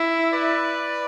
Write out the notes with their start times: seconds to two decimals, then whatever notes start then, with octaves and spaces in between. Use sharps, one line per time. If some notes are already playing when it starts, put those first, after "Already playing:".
Already playing: E4
0.33 B4 D5